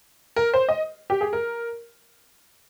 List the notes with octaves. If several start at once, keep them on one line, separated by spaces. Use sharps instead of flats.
A#4
C5
D#5
G4
G#4
A#4